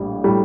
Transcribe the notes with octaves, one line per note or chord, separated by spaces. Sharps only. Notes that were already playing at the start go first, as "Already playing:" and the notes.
Already playing: A#1 A2 G3
A2 G3